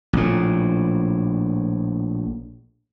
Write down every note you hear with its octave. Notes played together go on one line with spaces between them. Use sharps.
A#1 A2